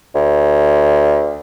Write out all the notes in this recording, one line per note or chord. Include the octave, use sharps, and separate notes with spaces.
D2